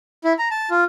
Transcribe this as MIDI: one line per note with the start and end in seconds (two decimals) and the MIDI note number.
0.24 0.33 64
0.39 0.49 82
0.51 0.69 81
0.70 0.84 65